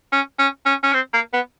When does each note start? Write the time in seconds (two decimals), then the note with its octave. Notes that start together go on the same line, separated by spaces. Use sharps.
0.12 C#4
0.39 C#4
0.66 C#4
0.83 C#4
0.93 C4
1.13 A#3
1.33 B3